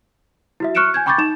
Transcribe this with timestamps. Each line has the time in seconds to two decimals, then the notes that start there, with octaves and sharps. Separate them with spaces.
0.60 E4 F#4 E5
0.75 C#6 F6 F#6 C#7 D7 E7
0.94 G#5 G6 G#6
1.06 G5 B5 C#6 D6 G6 A6
1.18 D#4 E7